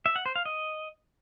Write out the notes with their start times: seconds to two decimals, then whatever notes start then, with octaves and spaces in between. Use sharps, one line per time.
0.06 E5
0.16 F#5
0.26 C5
0.36 F5
0.45 D#5